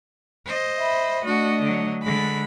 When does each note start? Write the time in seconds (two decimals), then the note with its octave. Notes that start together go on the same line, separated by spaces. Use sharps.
0.45 C5 D#5
0.76 E5 B5
1.25 A3 D4 F#4 D#5
1.62 D3 F#3
2.03 D3 G#3 B5